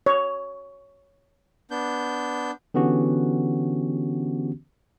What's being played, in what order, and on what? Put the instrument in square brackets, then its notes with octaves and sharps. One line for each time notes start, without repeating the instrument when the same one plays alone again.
[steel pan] C#5
[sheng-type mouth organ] B3 D4 G6
[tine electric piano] D3 E3 B3 C#4 F#4 G4